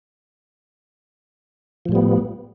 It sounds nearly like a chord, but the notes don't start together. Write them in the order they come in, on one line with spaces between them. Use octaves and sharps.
F3 A2 G3 B3